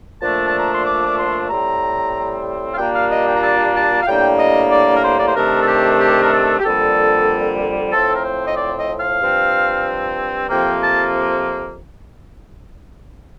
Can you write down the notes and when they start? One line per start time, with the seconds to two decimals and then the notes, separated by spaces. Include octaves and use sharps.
0.21 A#2 F3 A3 D4 A5
0.46 A5
0.59 A#5
0.73 C6
0.86 D6
1.06 D6
1.18 C6
1.50 A2 G3 C4 A#5
2.73 F5
2.78 A#2 G3 A#3 D4 G5
2.94 F5
3.11 D#5
3.27 G5
3.35 A#5
3.43 A5
3.75 A5
4.02 F5
4.07 A2 G3 A#3 D4 G5
4.39 D#5
4.72 D5
4.97 A#4
5.04 C5
5.20 D5
5.27 C5
5.35 C3 D#3 A3 D4 A#4
5.62 A4
5.68 G4
6.00 G4
6.23 A#4
6.32 A4
6.59 G4
6.64 F2 D3 G3 A#3 A4
7.93 A2 F3 C4 A4
8.15 A#4
8.25 C5
8.47 D#5
8.57 D5
8.78 D#5
9.00 F5
9.21 G2 F3 C4
10.50 F2 C3 F3 A#3 G5
10.82 A5